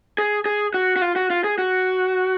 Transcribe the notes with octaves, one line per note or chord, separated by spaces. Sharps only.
G#4
G#4
F#4
F#4
F4
F#4
F4
G#4
F#4